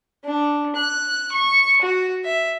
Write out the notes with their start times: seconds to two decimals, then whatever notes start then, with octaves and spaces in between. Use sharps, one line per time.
0.24 D4
0.76 F#6
1.32 C#6
1.81 F#4
2.25 E5